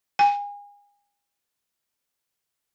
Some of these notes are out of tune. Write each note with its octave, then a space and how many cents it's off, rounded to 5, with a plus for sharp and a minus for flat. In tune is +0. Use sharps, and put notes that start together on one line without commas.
G#5 -35